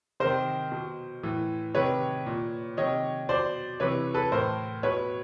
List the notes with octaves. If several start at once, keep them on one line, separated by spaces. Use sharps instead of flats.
C3 D#3 A#4 C5
B2
A2 E3
C3 D#3 B4 C#5
A#2
C3 D#3 C#5 D#5
B2 C5 D5
C3 E3 B4 C#5
A4 B4
A2 E3 A#4 C5
B2 B4 C#5